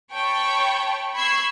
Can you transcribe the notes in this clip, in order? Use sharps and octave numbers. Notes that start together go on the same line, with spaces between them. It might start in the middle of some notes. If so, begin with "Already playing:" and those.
C#5 G5 A5 B5 C#6
B5 C#6 E6 G#6 C7